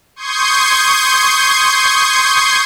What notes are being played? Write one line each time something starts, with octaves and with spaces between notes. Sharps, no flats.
C6 C#6 D#6 G6 G#6 C7